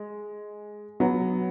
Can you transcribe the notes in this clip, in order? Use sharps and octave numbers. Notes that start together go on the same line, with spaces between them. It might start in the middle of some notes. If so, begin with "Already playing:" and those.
Already playing: G#3
F#3 B3